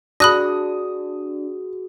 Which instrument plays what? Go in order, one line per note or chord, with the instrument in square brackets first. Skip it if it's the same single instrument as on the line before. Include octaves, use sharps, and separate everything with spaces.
[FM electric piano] D4 [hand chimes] F#4 G#4 [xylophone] B5 F#6 A#6 [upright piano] D#6